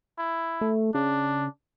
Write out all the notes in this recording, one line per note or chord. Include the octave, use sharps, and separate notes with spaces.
E4
A3
C#3 D4